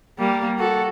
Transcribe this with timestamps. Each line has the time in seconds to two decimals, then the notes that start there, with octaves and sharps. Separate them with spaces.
0.19 G3 A#3
0.58 F#4 A4